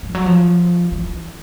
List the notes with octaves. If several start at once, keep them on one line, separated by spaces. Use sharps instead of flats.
F3
F#3
F3
E3